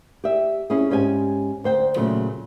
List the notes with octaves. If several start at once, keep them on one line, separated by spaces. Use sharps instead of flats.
G4 E5
C#4 E4 G#4
G#2 C#4 G4 G#5
D2 C5 G5
A#2 C#3 F#3 A3